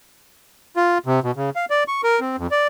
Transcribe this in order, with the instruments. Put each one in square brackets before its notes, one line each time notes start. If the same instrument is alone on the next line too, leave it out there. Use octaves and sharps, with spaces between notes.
[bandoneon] F4
C3
B2
C#3
F5
D5
C#6
A#4
C4
F2
D5